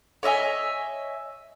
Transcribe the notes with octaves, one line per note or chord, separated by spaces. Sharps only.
C#5 D#5 E5 G#5